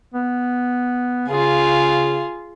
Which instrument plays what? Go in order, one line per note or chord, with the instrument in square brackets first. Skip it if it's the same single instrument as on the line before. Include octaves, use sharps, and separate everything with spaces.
[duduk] B3
[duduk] C#3 [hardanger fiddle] F4 G#4